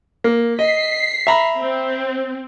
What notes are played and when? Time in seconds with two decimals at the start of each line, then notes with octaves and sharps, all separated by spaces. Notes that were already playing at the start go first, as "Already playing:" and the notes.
0.24 A#3
0.59 D#5 B6 C7
1.27 E5 A#5 B5
1.61 C4